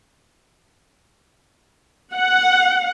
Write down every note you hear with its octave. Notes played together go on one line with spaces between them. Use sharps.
F#5